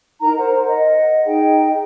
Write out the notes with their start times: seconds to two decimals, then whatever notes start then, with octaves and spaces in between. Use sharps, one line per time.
0.20 D#4 A#4 A#5
0.36 A#4 C5 F#5
0.65 D#5 F#5
1.25 D#4 G#4 G5